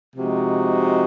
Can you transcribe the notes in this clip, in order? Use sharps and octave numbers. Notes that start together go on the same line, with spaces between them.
C3 F3 G#3 D#4 F#4